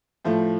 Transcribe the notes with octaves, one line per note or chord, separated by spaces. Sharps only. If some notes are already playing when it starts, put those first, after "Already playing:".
A2 F3 A3